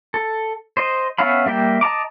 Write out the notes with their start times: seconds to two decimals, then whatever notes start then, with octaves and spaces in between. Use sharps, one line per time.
0.14 A4
0.77 C5 D#5
1.18 B3 C#4 E5 F5 B5
1.46 G3 A#3 E5 G5
1.81 D#5 A5 A#5 D6